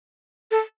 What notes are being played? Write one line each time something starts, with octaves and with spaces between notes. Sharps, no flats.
A4